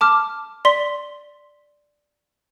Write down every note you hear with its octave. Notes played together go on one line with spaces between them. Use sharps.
A5 D6 F6
D5 C6 B6 G7